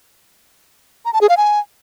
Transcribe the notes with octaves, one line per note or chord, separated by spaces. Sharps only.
A#5
A5
G#4
F5
G#5